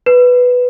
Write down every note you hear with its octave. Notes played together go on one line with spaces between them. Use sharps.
B4